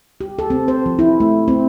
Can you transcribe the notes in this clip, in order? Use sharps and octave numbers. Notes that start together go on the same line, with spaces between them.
G4
A4
C4
C5
F3
E4
A3
C4